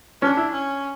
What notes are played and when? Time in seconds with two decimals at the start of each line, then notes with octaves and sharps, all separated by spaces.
0.22 C#4 D4
0.37 E4
0.52 C#4